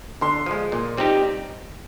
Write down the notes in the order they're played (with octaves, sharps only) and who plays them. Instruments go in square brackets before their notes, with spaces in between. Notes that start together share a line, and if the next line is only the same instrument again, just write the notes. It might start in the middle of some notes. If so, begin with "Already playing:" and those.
[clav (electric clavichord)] D3 [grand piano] C6
[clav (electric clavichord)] F3 G#3
A#2
G3 C4 D#4 G4